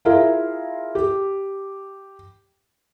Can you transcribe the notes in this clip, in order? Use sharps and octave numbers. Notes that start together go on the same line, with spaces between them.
E4 F4 G#4 A#4 E5 F5
G4